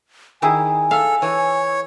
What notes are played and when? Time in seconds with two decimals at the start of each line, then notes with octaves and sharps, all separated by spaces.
0.42 D#3 E4 G#4 G#5
0.91 A4 E5 F5
1.22 E3 C#5